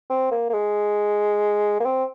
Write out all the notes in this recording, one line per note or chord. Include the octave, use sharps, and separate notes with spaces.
C4
A#3
A#3
G#3
A#3
C4